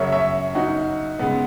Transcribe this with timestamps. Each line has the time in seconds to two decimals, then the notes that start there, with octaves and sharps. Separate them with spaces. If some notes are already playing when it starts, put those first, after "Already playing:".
Already playing: F#2 C#3 F#3 C#5 E5
0.12 C#5 E5
0.55 D#4 F#4
1.19 C#3 G#3 B3